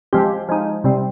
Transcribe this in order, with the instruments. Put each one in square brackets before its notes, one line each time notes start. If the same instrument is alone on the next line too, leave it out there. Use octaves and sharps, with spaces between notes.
[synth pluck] F3 G#3 C4 G4
F3 G#3 D#4
C3 G3 C4